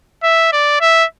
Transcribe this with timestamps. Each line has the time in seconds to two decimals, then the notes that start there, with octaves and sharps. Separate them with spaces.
0.24 E5
0.53 D5
0.81 E5